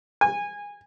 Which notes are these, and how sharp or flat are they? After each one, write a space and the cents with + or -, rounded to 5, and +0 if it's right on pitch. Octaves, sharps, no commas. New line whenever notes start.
G#5 -20